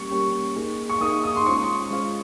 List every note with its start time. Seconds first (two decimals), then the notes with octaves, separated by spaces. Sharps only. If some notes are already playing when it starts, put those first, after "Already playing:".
Already playing: G3 A#3 C#4 G4 C#6
0.11 G3 A#3 C#4 G4
0.56 A#3 D#4 G#4
0.90 C#6
1.01 A#3 D#4 G#4 D#6
1.24 D#6
1.36 C6
1.46 G#3 C#4 F4 C5 C#6
1.91 G#3 C#4 F4 C5